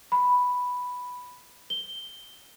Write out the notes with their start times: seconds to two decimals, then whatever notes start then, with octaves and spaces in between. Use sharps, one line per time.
0.12 B5
1.70 G7